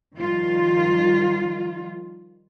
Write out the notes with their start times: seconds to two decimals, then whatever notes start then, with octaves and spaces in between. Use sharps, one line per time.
0.17 D#3 F3 G3 F4